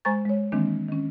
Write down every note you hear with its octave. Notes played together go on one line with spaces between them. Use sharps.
G#3 C5 G#5 A#5 C#6 A6
G#3 C#5
D#3 E3 G#3 A#3 C4 D4
D#3 C#4